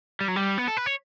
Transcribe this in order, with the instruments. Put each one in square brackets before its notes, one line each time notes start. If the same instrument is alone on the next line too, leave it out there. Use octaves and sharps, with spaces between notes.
[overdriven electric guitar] G3
F#3
G3
B3
A4
B4
C#5